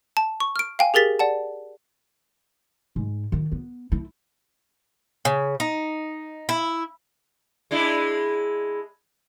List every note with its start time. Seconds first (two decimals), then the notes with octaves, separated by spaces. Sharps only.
0.17 A5
0.40 C#6
0.56 F6 D7
0.79 F5 G5 G#5
0.94 G4 G#4 A#4 A6 B6
1.19 D5 F#5 A5
2.96 G#2
3.32 D#3
3.52 B3
3.92 E4
5.25 C#3
5.60 D#4
6.49 E4
7.71 G#3 D4 E4